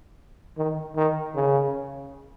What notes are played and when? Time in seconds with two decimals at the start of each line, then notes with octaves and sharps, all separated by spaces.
0.58 D#3
0.97 D#3
1.35 C#3